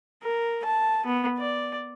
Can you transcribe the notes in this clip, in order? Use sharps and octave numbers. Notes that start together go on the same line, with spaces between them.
A#4
A5
B3
D5